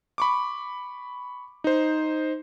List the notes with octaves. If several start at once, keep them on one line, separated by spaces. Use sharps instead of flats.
B5 C#6 D6
D#4 C5